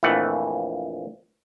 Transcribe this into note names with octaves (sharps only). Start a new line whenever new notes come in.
A#1 F2 E3 A3 F#5